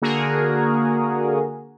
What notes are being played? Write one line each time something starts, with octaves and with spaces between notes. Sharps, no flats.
D3 A#3 F#4 G#4 A#4